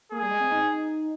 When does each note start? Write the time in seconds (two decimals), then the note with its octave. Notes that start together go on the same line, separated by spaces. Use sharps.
0.12 A#3 G#4
0.22 G3
0.31 G#3
0.40 C4
0.51 D#4